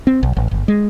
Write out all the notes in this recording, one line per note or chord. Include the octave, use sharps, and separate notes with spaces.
C4
B1
A1
G1
G#3